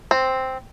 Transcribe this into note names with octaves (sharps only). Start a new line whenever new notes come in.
C4